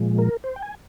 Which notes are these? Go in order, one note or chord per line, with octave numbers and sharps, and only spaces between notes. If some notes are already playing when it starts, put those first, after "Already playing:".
Already playing: A#2 F3 G#3
A#4
C5
G5
G#5